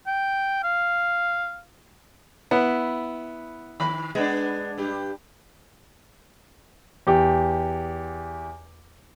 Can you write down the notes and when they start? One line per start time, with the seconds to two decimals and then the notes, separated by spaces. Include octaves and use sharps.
0.07 G5
0.63 F5
2.51 B3 E4
3.80 D#3 B5
4.15 G#3 B3 D4
4.78 G2 G4
7.07 E2 G4